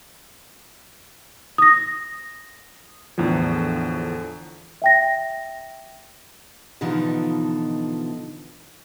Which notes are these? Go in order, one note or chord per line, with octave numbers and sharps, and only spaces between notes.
D#6 A#6
E2 A2 D3 F3
E5 G5 A#6
B2 D3 E3 F3 D#4 F4